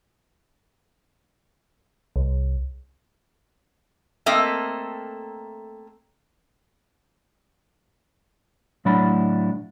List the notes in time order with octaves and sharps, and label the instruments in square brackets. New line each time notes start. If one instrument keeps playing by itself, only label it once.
[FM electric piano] C2
[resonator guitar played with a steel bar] A3 A#3 C4 A4 D#5 E5
[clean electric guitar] A2 F#3 D4 E4 F#5 B5